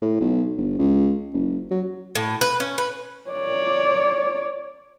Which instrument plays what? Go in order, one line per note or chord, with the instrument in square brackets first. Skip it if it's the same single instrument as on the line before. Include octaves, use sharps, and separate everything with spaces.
[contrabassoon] A2
B1
G1
C#2
F#1
F#3
[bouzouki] A2
B4
C#4
B4
[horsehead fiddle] C#5 D5